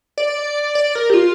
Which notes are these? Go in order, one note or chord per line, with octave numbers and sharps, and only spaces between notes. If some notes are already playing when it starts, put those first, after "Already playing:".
D5
D5
A#4
G4
F4